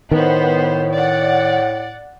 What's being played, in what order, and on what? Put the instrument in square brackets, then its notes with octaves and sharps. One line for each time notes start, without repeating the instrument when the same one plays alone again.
[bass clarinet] A2 [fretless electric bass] D#3 [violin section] B3 C5
[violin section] D5 F#5